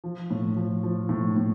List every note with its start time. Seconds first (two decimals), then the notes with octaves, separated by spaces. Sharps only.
0.04 F3
0.30 A2
0.57 F3
0.83 F3
1.09 A2
1.36 A2